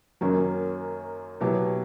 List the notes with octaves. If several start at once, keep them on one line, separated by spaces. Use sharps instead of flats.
F#2 D#3 F#3 A#3 C#4
B2 F#3 B3 E4 G4